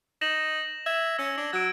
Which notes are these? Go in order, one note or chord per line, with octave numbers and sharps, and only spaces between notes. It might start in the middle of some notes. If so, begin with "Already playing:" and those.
D#4 A#6 E7 F#7
E5 G#6
C#4 E6
D4
F#3 G#6 D7